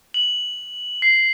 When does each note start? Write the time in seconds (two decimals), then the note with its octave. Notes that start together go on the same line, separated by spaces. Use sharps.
0.14 F#7
1.02 C7